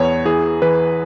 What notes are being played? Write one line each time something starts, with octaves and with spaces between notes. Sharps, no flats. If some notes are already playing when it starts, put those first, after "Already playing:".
Already playing: E2 B3 C#5
E3 G#4
E3 B4